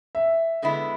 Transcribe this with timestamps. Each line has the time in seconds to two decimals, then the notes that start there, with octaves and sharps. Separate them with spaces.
0.15 E5
0.62 D3 G#3 B3 E4